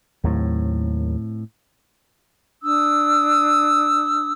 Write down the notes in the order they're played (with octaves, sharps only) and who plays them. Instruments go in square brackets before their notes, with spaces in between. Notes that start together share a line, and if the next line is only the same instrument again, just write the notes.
[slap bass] D#2 F#3 [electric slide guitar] A2 C4
[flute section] D4 D#6 E6